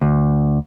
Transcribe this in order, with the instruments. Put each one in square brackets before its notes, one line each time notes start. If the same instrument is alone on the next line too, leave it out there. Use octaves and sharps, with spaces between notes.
[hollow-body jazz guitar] D2